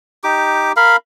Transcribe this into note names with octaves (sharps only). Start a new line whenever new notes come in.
D#4 G4 D6
A#4 F5 B5